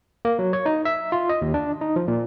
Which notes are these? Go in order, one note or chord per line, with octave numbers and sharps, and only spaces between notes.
A#3
F#3
C#5
D#4
E5
F4
D#5
D#2
D4
D#4
F3
A#2